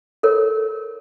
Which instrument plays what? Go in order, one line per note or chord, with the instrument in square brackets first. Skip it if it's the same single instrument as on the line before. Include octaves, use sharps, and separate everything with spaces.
[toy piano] A4 A#4 C#5